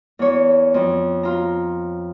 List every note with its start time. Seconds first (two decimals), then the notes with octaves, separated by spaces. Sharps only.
0.19 E2 C#5
0.74 F2
1.23 F4 A#5